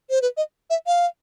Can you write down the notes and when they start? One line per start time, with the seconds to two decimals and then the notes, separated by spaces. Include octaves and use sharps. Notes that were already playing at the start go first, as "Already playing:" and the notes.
0.10 C5
0.22 B4
0.37 D#5
0.70 E5
0.87 F5